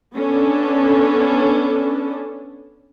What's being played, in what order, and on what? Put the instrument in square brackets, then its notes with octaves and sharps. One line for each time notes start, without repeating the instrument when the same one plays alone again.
[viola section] B3 C#4 D4 A4